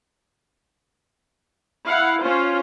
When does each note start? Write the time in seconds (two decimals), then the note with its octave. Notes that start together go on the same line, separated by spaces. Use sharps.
1.85 E4 F5 F#5
2.23 C#4 F4 C5